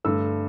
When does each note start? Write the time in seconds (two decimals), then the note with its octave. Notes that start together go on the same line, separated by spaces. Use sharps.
0.04 G2 D3 A3 E6